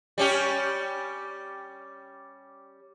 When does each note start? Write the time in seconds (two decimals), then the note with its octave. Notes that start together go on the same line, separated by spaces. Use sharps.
0.18 G3 C#4 G4